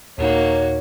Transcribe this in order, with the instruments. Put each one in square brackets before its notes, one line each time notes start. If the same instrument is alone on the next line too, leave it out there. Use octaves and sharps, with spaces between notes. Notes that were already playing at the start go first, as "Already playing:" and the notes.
[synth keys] D#2 A#2 D#4 [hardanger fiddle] A#3 F#4 [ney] C#5